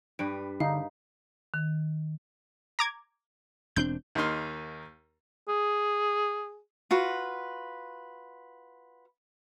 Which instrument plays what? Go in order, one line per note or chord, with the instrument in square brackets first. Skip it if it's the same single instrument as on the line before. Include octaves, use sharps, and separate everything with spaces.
[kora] G2 G3 B4 [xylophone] D7
[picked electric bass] D3 [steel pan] D#4 [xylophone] F5
[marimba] D#3
[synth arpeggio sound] A#5 D6 G#6
[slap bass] E1 C4 D4 [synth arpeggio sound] G6
[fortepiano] D#2 A#3 D#4 C6 F6
[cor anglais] G#4
[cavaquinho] F4 F#4 B4